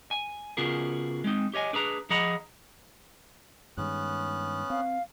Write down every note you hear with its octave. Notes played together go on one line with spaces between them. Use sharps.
G#5
C#3 B3 F4 F#4 G#4 A#4
G#3 C4 D#4
G4 C#5 D#5 G#5
D4 G#4 B4 A#5
F3 G#4 D#5 F#5 A#5 B5
G2 D#3 G#3 B3 C#4 F#6
C4 F5